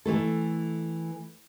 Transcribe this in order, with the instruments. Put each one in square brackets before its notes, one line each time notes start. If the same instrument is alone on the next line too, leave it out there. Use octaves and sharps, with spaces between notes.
[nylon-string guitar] E3 A3 A4